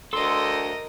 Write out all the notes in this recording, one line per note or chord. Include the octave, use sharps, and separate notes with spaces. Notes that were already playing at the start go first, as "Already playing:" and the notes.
D2 A4 A#4 D#5 C6